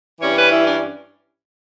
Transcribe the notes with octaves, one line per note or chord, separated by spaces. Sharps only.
G2 E3 G3 C#4 C#5
B4
E4
D4